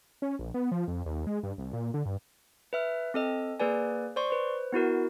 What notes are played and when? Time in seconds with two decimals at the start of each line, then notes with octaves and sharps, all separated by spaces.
0.22 C#4
0.39 A#1
0.54 B3
0.72 F3
0.88 F2
1.06 D#2
1.27 G#3
1.43 G2
1.58 C2
1.73 A#2
1.94 D3
2.06 G2
2.73 B4 E5 F6
3.14 C4 A4 D#5
3.60 A#3 G#4 B4 D5 G#5
4.16 C5 D5 C6 C#6
4.31 B4 C5
4.72 B3 E4 F#4 A#4